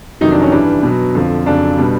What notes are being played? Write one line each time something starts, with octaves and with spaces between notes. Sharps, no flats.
F2 C3 D#3 F#3 D#4
D4
C#4
G2 E3 G3 D4
B2 F#3
F2 D3 F3
F2 C#3 F#3 D4
B2 G3